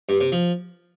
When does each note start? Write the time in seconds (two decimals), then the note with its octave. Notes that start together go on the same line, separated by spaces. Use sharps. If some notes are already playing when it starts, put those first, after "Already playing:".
0.09 G2
0.20 C3
0.32 F3